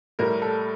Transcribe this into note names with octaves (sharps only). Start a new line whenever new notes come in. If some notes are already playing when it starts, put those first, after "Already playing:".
A2 G3 A#4
A4